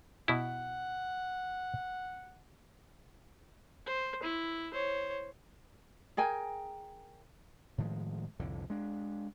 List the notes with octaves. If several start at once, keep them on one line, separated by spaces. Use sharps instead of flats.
B2 E4 F#5
C5
E4
C5 C#5
G#4 A#4 G5 G#5
A2 D#3 F3 G#3
C2 F2 A2 D3
G#3 D4